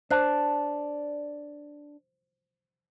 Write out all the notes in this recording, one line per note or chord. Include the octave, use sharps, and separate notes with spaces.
D4 C5 F#6